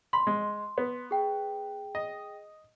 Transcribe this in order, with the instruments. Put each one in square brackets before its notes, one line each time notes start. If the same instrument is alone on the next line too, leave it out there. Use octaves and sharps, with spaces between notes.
[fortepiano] B5 [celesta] C6
[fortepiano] G#3
B3
[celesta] G#4 G5
[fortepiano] D#5